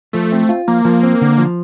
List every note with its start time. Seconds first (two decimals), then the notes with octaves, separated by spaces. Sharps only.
0.13 F3 A3
0.32 C4
0.49 F4
0.68 F3 A#3
0.85 F3
1.03 C4
1.21 D3
1.38 F3